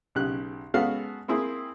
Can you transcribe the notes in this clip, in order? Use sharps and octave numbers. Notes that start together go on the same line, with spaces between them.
B1 C#3 G4 F#6
G#3 B3 C#4 F#4 A4 F5
A#3 C4 E4 G#4